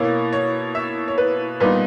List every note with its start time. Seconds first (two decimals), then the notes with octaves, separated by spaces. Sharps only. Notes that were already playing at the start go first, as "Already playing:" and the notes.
Already playing: B2 A#3 E4 C#5
0.33 C#5
0.75 E5
1.08 C#5
1.18 B4
1.60 A#2 G3 B3 D#4 B4